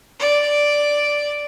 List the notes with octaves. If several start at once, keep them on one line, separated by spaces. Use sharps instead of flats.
D5